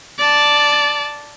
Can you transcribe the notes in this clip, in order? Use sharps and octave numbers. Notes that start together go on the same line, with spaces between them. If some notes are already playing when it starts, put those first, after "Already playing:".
D5 A5